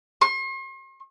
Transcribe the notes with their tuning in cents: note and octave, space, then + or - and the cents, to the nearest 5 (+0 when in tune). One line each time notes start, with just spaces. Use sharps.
C6 +45